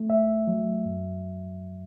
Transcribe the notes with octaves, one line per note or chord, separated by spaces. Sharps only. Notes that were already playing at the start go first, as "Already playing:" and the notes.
Already playing: A3
C2 E5
F#3
F#2